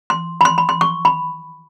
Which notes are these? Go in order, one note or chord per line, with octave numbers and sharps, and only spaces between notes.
C6
B5
C6
B5
C6
C#6
B5